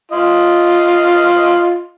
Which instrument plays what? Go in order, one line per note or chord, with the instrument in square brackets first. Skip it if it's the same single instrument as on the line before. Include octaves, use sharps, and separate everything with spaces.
[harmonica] F4 D#5